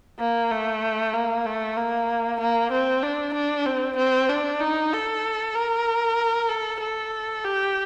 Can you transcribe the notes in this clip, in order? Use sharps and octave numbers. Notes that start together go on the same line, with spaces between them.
A#3
A3
A#3
A3
A#3
A#3
C4
D4
D4
C4
C4
D4
D#4
A4
A#4
A4
A4
G4